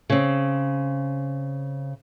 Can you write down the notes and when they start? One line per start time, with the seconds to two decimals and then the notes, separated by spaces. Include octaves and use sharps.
0.10 C#3 C4